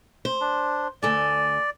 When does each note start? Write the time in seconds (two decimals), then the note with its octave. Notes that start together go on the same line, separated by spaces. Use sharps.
0.25 C5
0.41 D4
1.03 D2 A4 D5 G#5